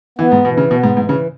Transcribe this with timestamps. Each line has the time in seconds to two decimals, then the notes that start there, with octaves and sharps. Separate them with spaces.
0.18 E3 B3
0.32 G#2
0.45 B2 E3
0.57 C#3
0.70 B2 B3
0.84 G#2
0.97 G#2 E3
1.09 C#3